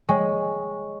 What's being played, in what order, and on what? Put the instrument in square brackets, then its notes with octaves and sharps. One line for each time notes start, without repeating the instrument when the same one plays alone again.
[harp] G#3 [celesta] C#5 G5 C#6